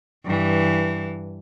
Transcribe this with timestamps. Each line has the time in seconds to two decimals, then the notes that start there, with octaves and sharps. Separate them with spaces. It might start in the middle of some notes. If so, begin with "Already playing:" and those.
0.25 G2 E3